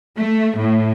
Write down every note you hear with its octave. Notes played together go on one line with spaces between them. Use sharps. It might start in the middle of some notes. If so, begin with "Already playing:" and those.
A3
A2